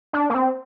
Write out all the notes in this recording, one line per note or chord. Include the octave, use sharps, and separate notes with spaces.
D4
A#3
C4